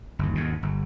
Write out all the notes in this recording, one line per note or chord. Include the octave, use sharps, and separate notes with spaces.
G1 D#2
D#2 G#2 B2
G1